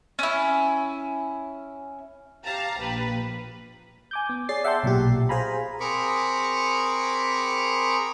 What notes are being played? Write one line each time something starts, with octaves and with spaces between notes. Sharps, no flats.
C#4 E4
G4 F5 A5 A#5
A#1 G4 B4
G#5 D6 G6
B3
G#4 C#5 D5 A6 C7
E5 F#5 G5 A5 C6
B1 A#2 G4
G#4 C5 F5 G#5 A#5 B5
C4 G#4 A#4 B5 C#6 D6